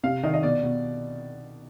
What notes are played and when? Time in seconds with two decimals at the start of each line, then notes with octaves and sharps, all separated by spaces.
0.04 C3 F5
0.23 D#3 D#5
0.34 D#5
0.43 B2 D5
0.63 B2